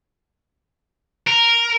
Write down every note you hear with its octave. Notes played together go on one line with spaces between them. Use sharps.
A#4